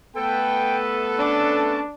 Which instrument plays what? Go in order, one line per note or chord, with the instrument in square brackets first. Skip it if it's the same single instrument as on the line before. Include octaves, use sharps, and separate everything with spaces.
[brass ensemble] A3 B3 B4 [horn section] A4 [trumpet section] G5
[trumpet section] C#4 A5 [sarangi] D4